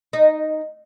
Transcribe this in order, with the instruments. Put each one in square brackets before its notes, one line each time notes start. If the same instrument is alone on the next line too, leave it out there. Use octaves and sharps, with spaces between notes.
[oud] D#4